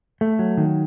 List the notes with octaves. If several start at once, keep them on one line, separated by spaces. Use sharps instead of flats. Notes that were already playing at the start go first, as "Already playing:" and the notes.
A3
F#3
D#3